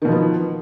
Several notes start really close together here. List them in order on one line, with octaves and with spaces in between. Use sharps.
D#3 B2 F3 B3